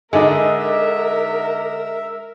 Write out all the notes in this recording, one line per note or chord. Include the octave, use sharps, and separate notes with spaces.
D3 G#3 D4 D#4 A#4 E5